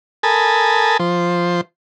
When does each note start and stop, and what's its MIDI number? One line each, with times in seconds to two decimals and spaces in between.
0.23 0.97 69
0.23 0.97 70
0.23 0.97 80
0.23 0.97 81
0.23 0.97 83
0.23 0.97 87
1.00 1.61 53
1.00 1.61 72